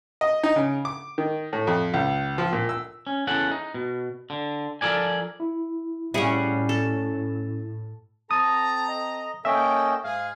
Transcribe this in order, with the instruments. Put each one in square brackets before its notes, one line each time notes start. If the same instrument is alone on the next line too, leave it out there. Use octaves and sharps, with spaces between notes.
[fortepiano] D#5
D#4
C#3
D6
D#3
A2
F2
C#2
F3
A#2
E6
[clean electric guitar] C#4
E2 C#4 A4 F#5
D#4
B2
D3
F3 A4 A#4 D5 G#5
[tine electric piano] E4
[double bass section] A2 [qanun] G3 G#4 F#5 [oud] C#4 E5
[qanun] A4
[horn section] C4 A4 A#5 [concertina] A5 [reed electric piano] D#6
[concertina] D#5
[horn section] A#3 A4 G5 [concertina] C#4 D#5 E6 [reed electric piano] E5
[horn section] G#2 G#4 [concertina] F5